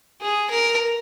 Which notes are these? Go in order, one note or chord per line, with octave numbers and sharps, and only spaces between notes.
G#4
A#4